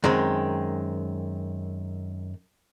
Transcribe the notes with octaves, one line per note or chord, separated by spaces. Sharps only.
F#2 D#3 G#3 C4